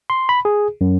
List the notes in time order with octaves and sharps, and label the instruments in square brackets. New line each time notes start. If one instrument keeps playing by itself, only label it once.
[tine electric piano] C6
B5
G#4
F#2